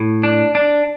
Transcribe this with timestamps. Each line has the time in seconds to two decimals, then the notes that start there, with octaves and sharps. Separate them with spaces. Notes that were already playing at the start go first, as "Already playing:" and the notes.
Already playing: A2
0.23 D4
0.55 D4